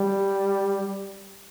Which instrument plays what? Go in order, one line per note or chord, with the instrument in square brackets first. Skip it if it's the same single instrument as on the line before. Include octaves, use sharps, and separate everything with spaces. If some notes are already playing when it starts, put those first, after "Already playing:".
Already playing: [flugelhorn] G3